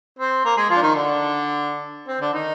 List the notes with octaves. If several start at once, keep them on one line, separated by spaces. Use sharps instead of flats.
C4 C5
A#3 A#4
G#3 G#4
F3 F4
D4
D#3 D#4
D3 D4
C4
D3 D4
D#3 D#4